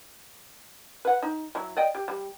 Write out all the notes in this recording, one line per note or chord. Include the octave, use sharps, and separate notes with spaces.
B4 F#5
D#4
F#3 E4
D5 D#5 G5
G4
G3